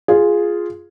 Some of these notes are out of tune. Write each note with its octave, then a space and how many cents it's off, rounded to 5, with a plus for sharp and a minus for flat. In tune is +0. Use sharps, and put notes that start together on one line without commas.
F4 +0 G#4 +0